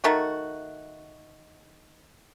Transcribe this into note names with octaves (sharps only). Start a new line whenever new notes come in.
D#3 A3 F#4